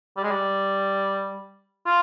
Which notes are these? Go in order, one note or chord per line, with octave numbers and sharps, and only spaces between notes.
G3
G#3
G3
F4